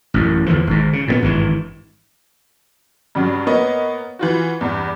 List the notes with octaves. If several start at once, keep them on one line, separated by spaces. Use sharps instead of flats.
A1 F#2
E2 D3 E3 F3
G#1 G#2
C#3
A#2 G3 B3
G#1 G2 D3 E3
G2 C#3 F#3
A#3 B3 C#5 D#5
E3 F4 F#4
E2 G2